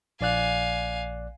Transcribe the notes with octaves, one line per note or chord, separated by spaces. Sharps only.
A#1 D5 F5 G#5 F#6